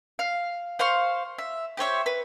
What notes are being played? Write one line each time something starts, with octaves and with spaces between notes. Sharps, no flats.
F5
C5 F5 C6 C#6
E5
G4 C5 C#5 E5
B4